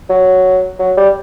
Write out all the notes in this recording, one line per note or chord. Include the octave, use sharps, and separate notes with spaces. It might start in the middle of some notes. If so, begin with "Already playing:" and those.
F#3
F#3
G3